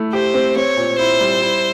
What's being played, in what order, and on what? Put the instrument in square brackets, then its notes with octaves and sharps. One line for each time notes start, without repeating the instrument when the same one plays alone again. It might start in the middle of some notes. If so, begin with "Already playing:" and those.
Already playing: [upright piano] A3 E4
[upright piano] G4 [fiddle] C5
[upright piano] C4
[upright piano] C4 [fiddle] C#5
[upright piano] A#2
[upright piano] E4 [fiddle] C5
[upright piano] G3
E4